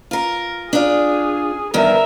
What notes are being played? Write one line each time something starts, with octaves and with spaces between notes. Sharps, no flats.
F4 A#4
D4 F4 G#4
E2 G2 D#3 A#4 E5